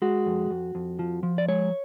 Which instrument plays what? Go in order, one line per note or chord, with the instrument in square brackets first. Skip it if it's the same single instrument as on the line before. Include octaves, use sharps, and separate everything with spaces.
[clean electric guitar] G#3 F#4
F2
F2
F2
F3
F3
D5
G#3 C#5